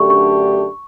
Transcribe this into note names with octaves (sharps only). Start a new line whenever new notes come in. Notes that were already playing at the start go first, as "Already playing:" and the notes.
Already playing: F#2 D3 A3 D4 G4 C#6
C#6